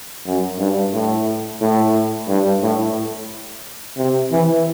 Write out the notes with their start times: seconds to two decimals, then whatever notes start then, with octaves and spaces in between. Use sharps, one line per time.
0.26 F#2
0.59 G2
0.94 A2
1.62 A2
2.28 G2
2.63 A2
3.98 C3
4.32 E3